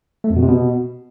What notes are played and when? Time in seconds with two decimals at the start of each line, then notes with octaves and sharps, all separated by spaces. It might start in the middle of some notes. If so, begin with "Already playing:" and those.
0.24 A3
0.30 F2
0.36 B2
0.42 C3
0.48 B2